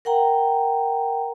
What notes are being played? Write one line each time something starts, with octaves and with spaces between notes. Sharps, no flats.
A#4 F#5 G5 A#5